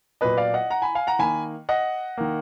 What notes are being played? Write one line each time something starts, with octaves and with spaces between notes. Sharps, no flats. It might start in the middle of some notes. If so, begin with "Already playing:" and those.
A#2 F#3 B3 B4 D#5
D5 F5
D#5 F#5
F#5 A#5
G#5 B5
F5 G#5
F#5 A#5
D#3 A#3 G#5 B5
D#5 F#5
D#3 A#3